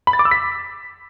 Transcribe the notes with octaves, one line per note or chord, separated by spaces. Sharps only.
B5
A6
D6
E6
B6